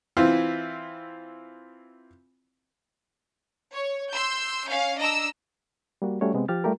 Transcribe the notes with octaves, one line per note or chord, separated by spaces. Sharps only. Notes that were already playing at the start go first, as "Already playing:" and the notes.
E3 C4 E4 F4
C#5
C6 E6 G6
C#4 F5
D4 D#5 A#5 E6
G3 A#3 F#4
G3 A3 C#4 F#4 C#5
C3 G#3 B3 C4
F3 G4 F6 A6
G3 A3 F4 G4 A#4